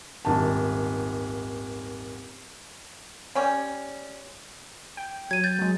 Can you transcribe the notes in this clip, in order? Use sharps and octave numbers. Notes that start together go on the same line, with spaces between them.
D#1 G#1 A5
G3 C#4
G5
F#3 G#6 D#7
G6 A6
F#3 G#3